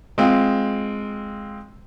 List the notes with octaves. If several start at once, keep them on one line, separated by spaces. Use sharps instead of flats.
G#3 C4 F4